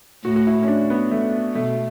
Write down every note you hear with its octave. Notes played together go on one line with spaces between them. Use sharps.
A2 F#4
F#4
E4
C#4
D4
B3
A3
B2 A3